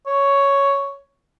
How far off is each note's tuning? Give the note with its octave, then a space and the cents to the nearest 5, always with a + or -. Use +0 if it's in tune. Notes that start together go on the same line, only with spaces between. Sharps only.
C#5 +5